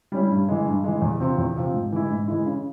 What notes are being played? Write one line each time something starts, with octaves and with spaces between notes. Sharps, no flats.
G3 C#4 E4
G2
E3 G#3
G2
E3 G#3
E2
C3 F3 C4
E2
C3 F3 C4
G#2
E3 G#3 E4
G#2
E3 G#3 E4
C#3